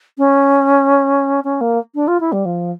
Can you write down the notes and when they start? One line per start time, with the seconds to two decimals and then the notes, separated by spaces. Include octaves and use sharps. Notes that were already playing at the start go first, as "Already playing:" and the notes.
0.18 C#4
1.44 C#4
1.61 A#3
1.95 D4
2.08 F4
2.20 E4
2.32 G3
2.45 F3